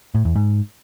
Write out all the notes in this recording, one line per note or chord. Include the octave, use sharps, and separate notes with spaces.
A2
E2
G#2